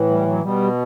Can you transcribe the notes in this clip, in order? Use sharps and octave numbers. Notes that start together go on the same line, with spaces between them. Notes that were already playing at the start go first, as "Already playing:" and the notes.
Already playing: A2 E3
G3
F#3
B2 G3